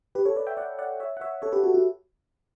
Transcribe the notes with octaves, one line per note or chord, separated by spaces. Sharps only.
G4 B4
A4 C#5
B4 D5
E5 G5
D5 F#5
D5 F#5
C#5 E5
F#5
C#5 E5
A4 C#5
G4 B4
F#4 A4
F#4